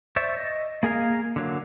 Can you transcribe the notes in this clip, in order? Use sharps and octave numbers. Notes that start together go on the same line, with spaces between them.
C5 D5 E5 C#6
D#5
A#3 G#4 A#4 F5 G#5
D3 F#3 A#3